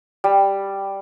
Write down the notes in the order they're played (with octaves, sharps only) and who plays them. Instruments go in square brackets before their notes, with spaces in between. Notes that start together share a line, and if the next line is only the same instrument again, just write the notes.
[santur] G3